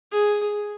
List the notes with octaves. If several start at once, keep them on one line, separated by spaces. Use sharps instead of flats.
G#4